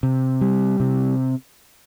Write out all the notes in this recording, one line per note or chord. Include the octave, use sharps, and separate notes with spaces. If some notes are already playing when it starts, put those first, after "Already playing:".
C3
G3
C3